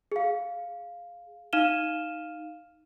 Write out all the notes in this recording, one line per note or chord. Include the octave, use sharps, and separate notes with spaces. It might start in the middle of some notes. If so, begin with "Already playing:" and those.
G#4 F5
D#4 F5 F6 D#7 E7 G7